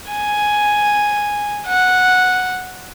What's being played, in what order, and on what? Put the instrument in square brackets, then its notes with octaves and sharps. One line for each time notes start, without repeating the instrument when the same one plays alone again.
[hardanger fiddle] G#5
F#5